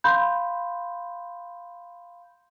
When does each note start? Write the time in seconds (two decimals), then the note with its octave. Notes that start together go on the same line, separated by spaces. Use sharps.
0.04 F5 B5 C6 G6